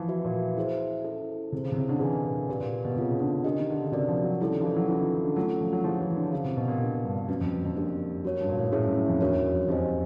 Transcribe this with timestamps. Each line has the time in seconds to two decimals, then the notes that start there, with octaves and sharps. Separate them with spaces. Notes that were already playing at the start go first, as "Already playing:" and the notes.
Already playing: E3 F3
0.09 F#4 B4 E5
0.25 A#2
0.57 E4 G#4 C5 E5
1.04 C#4 E4 A4
1.52 C3 E4 G#4 C5
1.65 C#3
1.72 C3
1.77 C#3
1.89 D3
2.00 E3 G#4 B4 D#5 G#5
2.25 A#2
2.48 A#2 D4 G4 B4 D5
2.60 A#2
2.85 B2
2.96 C3 C4 F4 G#4 C#5
3.09 C#3
3.20 D3
3.44 D4 G4 A#4 D#5
3.59 D#3
3.70 D3
3.82 C#3
3.92 C3 F#4 A#4 D5
4.08 F3
4.24 F#3
4.41 G3 C#4 E4 A4
4.52 D#3
4.60 F3
4.65 E3
4.76 F#3
4.88 E3 C#4 F4 A4
5.01 D#3
5.24 D3
5.36 F#3 A3 C#4 F4 A4
5.55 F#3
5.61 F3
5.73 F#3
5.84 F3 E4 G#4 C#5
6.00 E3
6.16 D3
6.33 C#3 G4 C5 F5 A5
6.45 C3
6.57 B2
6.68 A#2
6.80 D4 G4 A#4
7.05 G2
7.28 F#2 A#3 C#4 F#4 B4
7.41 F2
7.65 F2
7.77 A#3 D4 G4 A#4
8.24 F#2 F#4 A#4 C#5
8.41 G2
8.49 A#2
8.57 A2
8.72 A2 C#4 E4 G#4 C#5 E5
8.85 F#2
8.97 F#2
9.08 F2
9.20 E2 D4 F#4 A#4 C#5 F#5
9.36 F2
9.48 F#2
9.52 F2
9.68 F2 D#4 G4 C5 D#5 G#5